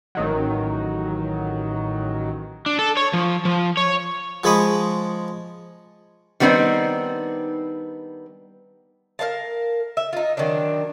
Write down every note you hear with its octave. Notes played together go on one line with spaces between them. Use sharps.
A1 D#3 F#3
D4
A4
C#5
F3
F3
C#5
F3 G#3 G#4 B5 C#6 D#6
D#3 G3 B3 C4 D4 D#4
A#4 C5 F5 A5
E5
D#4 F4
D#3 F#3 C4 D4